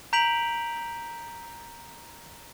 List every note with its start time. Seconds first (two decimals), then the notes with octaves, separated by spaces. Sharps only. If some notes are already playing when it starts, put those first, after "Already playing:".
0.13 A#5 G6 B6 D7 F7 F#7